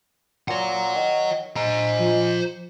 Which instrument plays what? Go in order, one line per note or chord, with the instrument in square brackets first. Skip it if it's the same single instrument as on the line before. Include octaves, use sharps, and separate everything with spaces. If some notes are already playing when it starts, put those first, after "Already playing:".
[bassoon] A#2 [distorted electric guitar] C#5 F#5
[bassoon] D#3
[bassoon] G#3 [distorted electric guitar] C5 A#5
[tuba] F3